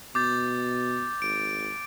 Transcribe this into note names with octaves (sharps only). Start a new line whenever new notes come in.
B2 D6 G6 A6
G#1 D7